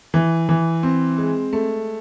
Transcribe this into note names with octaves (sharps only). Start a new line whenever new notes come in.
E3
E3
C4
G#3
A3